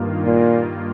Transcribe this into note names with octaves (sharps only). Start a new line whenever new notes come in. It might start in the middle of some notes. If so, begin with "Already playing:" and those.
Already playing: G2 D#3 A#3 F4
A#2